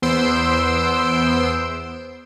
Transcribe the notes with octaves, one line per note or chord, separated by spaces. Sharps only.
E2 B3 C5 C6 E6 D7